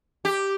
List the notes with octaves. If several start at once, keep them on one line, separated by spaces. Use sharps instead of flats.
G4